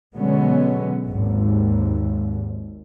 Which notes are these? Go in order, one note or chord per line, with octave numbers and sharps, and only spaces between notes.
B2 D3 F#3 G#3 B3 C#4
G#1 D#2